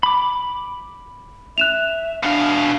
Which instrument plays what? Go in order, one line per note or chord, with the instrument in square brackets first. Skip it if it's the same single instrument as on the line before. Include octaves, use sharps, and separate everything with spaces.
[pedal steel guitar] B5 D6
[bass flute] E5 [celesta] F#6 E7 F7
[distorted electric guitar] B2 F5 [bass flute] D4